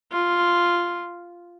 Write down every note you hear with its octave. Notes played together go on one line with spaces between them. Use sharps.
F4